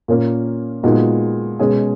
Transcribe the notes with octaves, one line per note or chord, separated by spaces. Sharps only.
A#2 A#3 C#4
A#2 G#3 B3 D#4 F#4
B2 G#3 C#4 G#4